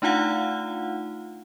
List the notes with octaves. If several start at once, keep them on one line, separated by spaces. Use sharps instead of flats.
A3 D4 D#4 F4 F5 F#5